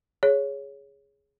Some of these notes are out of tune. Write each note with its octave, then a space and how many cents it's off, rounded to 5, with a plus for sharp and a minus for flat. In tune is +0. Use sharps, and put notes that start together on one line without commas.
G#4 +0 C#5 +5